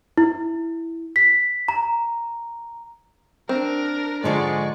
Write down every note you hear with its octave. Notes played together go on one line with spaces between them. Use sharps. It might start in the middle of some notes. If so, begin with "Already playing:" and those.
E4
B6
A#5
C4 D4 A#4
G#2 D3 F3 G#3 D5 C#6